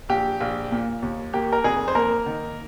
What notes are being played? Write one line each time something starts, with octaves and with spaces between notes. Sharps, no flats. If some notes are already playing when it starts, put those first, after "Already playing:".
A#1 G4
A#1
A#2
D#2
A#3 G4
A#4
F1 G#4
C5
A#3 A#4
D#3